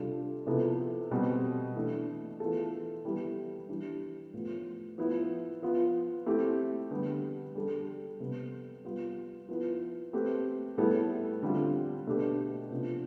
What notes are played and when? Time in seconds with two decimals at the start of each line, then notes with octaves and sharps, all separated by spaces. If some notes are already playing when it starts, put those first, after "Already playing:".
Already playing: C3 G3 D4 F4 A4
0.47 C3 F3 B3 E4 A4
1.11 B2 G3 C4
1.76 E3 A3 D4
2.40 E3 B3 F4 A4
3.05 E3 G3 B3 E4 G4
3.69 E3 G3 D4 G4
4.33 A2 F3 B3
4.98 F3 B3 E4 B4
5.62 F3 B3 F4
6.26 A3 C4 E4 G4
6.91 D3 G3 B3
7.55 G3 D4 A4
8.20 C3 G3 B3
8.84 G3 B3 F4
9.49 F3 B3 E4 B4
10.13 A3 C4 G4 B4
10.78 A2 G3 B3 E4 A4
11.42 D3 G3 C4 F4
12.07 B2 A3 D4 G4 B4
12.71 C3 F3 B3 D4